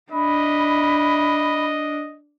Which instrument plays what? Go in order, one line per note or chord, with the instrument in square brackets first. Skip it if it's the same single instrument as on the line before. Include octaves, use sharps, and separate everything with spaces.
[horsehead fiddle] D4 [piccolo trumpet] D#5 [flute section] E5 B5